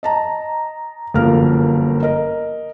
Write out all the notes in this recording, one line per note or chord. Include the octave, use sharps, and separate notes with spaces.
D#5 A5 A#5
G1 F#2 F3 A#3 A#4 F6
A#4 D#5